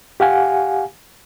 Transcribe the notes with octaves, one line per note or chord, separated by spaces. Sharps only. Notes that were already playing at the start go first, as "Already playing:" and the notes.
G4 F5 F#5 G#5